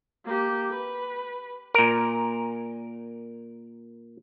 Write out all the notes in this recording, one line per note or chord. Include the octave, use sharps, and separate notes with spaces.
A#3 G4
B4
A#2 A#4